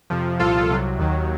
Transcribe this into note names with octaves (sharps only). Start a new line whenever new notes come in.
F2 C3 F3
C2 A#2 F3 F4 A4
C2 C3 F#3
D#2 D#3 F#3